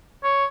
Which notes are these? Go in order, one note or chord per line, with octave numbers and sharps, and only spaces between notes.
C#5